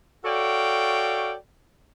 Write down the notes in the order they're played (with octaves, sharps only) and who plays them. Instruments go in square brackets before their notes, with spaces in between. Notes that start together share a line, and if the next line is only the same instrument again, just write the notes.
[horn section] F#4 A4 C#5 D5 F5 G5